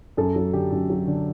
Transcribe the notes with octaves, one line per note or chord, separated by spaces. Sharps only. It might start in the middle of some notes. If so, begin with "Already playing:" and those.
F#2 A4
F#3
D3 G4
F#2
F#3
D3